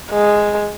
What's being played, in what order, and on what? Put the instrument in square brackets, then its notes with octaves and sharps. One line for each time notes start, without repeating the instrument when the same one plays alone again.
[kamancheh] G#3